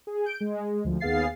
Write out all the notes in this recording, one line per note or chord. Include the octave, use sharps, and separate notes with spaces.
G#4
G6 D7
G#3
D2 F3
D#2 B3 G#4 F5 A6 C7